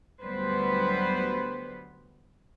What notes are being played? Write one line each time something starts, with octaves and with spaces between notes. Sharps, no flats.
D2 F#3 G3 B3 B4 C5